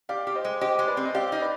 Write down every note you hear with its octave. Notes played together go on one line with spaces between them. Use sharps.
G4 D5 F5
G4
C5 D#5
G#3
G4 C5 D#5
G#3
B4 D5
C4
D#5
G4 D5 F5
D#4
B4 D5